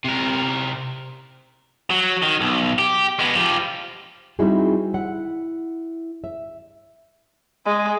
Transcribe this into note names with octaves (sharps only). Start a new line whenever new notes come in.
C3 A#4
F#3
D#3
B1
G4
G#3 B3
F3 G4
G3 C4 D#4 E4 F#4 G#4
E4 F#5
E5
G#3